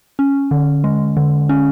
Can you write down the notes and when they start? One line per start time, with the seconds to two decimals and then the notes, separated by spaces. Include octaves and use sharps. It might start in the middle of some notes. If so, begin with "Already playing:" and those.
0.19 C#4
0.51 D3
0.84 G#3
1.17 D3
1.49 C#4